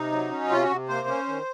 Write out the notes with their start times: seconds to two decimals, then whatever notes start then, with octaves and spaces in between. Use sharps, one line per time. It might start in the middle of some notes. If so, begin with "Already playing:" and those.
Already playing: C3 D#4
0.12 F#3
0.31 C#4
0.50 C3 F4
0.63 F#4
0.70 C3
0.88 A#3 C5
1.08 C#4
1.27 D#3